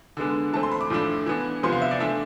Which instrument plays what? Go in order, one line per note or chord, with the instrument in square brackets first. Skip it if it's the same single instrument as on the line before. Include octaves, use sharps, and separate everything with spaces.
[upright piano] D3 G#3 B3 D4
E3 A3 C4 A5
C6
B5
D6
A2 F3 A3 D4
E3 B3 D4
C3 F3 B3 C6
F5
E5
D5
E3 A3 D4 E5